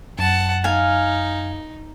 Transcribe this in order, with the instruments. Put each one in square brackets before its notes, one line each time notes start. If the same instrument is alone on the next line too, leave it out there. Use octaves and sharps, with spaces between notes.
[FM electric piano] F#2 [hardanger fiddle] F#5 A5
[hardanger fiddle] D#4 [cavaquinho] F5 G#5